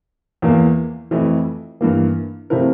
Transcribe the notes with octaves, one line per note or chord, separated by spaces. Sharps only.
E2 E3 A#3
F2 E3 A3 E4
G2 E3 A#3
C3 F3 A3 E4 A#4